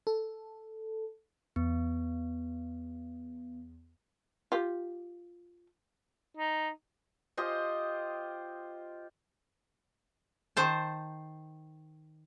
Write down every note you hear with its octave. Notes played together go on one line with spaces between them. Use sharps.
A4
E2 B3
F4 G4
D#4
F4 G4 C5 D#5
D#3 C5 A5